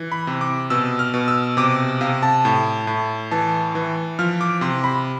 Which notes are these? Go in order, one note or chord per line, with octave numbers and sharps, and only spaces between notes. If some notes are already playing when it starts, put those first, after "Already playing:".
Already playing: E3
B5
C3
D6
B2 E6
F6
B2
E6
C3 D6
C3 F5
A5
A2
A2
E3 A5
E3
F3 F6
D6
C3 C6
B5